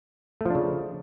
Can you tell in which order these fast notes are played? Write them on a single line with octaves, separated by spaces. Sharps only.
A3 F3 D4 C#3